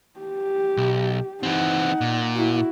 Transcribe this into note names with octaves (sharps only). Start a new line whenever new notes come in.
G4
B1
E3 C4 D#4 F#5
A#2
E4 F#4